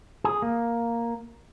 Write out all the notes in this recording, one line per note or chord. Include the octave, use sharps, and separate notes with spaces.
G#4
A#3